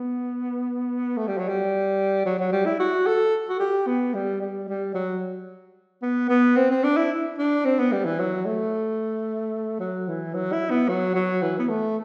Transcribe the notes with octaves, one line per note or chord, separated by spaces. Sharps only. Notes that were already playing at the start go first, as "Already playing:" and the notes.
Already playing: B3
A3
G3
F#3
G3
F#3
F#3
G3
E4
F#4
A4
F#4
G4
B3
G3
G3
G3
F#3
B3
B3
C4
C4
D4
E4
D4
C4
B3
G3
E3
F#3
A3
F#3
E3
F#3
E4
B3
F#3
F#3
E3
B3
A3